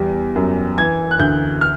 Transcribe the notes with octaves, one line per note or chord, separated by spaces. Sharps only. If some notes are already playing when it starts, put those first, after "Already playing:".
Already playing: E2 G3
F#2
E3 G#6
F#6
D2 G6
F6